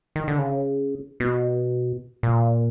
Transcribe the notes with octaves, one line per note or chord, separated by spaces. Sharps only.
D#3
D3
C#3
B2
A#2